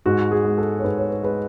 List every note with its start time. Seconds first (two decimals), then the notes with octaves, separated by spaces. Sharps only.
0.06 G#2 F#4
0.31 G#4
0.45 G#3
0.58 A4
0.79 C#5
0.84 G#2 B4
0.98 C#5
1.10 B4
1.23 G#3 B4